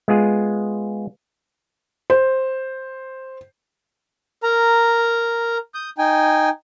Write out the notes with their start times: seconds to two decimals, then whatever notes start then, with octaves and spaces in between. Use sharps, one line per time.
0.08 G#3 B3 F4 G#4
2.10 C5
4.43 A#4 A#5
5.74 D#6 G6
5.98 D#4 G5 G#5